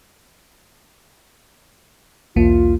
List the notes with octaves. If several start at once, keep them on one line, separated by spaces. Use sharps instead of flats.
B1 E2 A#3 F4